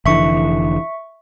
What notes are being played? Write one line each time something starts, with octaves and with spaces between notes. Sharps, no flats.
F1 D3 E3 E5 C#6